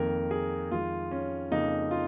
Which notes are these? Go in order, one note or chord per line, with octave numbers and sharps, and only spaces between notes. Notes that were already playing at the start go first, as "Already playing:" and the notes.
Already playing: F2 D#3 A#3 A#4
G#4
F2 D#3 G#3 F4
C#4
F2 C#3 F3 A#3 D#4
F4